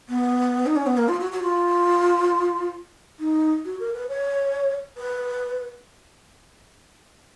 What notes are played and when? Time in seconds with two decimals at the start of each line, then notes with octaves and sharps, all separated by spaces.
0.09 B3
0.66 D#4
0.76 C#4
0.86 B3
0.97 A#3
1.08 F4
1.20 F#4
1.32 F#4
1.43 F4
3.20 D#4
3.65 F#4
3.80 A#4
3.94 B4
4.09 C#5
4.97 B4